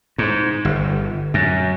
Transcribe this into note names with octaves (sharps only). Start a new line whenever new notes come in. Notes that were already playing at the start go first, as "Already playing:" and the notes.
G#2
G1
F#2